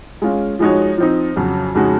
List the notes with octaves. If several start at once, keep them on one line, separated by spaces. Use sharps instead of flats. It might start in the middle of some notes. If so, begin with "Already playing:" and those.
G#3 C#4 F4
F3 G#3 D#4 F#4 C#5
F3 C4 D#4
F2 C#3 F#3
F2 C#3 G#3 D#4 F#4